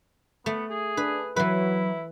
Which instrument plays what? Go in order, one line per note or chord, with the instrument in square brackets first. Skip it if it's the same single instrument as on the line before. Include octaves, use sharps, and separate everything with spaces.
[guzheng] A3 [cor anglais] B3
[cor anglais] G#4
[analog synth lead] D4 [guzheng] B4
[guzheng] E3 B4 [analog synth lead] F#3 [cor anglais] E4